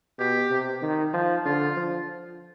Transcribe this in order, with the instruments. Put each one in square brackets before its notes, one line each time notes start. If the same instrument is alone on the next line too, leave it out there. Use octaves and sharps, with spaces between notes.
[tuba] B2 [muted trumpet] G4
[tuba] C3
D#3
F3
[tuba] D3 [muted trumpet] F4
[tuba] F3